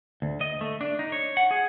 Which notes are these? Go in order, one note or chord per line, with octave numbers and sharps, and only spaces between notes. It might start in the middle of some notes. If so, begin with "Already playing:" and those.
D2
D#5
A3
D4
D#4
C#5
F#5
G#4